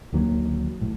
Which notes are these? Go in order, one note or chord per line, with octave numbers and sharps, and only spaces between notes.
D2 D#3 F#3 A#3
A#1 A2